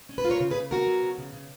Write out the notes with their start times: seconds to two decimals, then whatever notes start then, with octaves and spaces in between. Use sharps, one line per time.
0.09 C#4
0.18 B4
0.25 F4
0.30 A#4 C#5
0.40 C#3
0.50 G#4 B4
0.56 C#3
0.71 B3 F#4 A#4
0.87 F#3
1.02 C#3
1.18 C#3
1.34 C#3